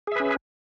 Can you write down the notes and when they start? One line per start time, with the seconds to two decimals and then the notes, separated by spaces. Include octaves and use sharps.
0.07 G#4
0.12 E5
0.16 B4
0.20 C#4